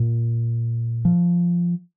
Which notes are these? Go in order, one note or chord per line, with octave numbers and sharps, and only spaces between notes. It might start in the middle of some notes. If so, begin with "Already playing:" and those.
Already playing: A#2
F3